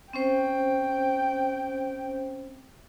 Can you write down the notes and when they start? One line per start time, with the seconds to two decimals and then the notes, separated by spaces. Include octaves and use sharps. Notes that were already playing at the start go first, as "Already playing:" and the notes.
0.13 C4 C#4 C5 G5